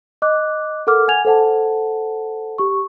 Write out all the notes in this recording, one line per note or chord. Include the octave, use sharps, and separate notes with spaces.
D#5 D6 F#6
A4 A#4 F#5 D6 F6
F#5 G#5 G#6 F7
A4 C5 F#5 A5
G4 C#6